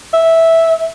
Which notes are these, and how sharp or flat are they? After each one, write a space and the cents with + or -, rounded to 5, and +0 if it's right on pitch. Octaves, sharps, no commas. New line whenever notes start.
E5 -5